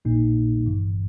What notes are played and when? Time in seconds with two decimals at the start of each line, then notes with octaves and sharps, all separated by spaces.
0.05 A#1 A#2 A#3 D#4
0.66 G1 G2 E3